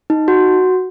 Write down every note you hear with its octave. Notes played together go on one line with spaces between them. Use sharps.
D#4
F#4